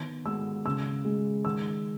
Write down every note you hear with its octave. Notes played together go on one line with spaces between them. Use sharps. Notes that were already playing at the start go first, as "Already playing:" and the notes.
Already playing: D#3 B3
G#3 E6
C#3 E6
G#3
D#3 E6